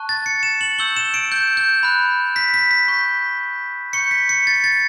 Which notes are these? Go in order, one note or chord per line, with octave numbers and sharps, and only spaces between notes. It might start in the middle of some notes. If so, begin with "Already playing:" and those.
Already playing: A5 C#6 F#6
A6
C#7
E7
F#7
C#6 E6 G6 G7
E7
D7
G6
G6
B5 F#6
B6
B6
B6
C#6 G6
C#6 G6 C#7
B6
C#7
A6
A6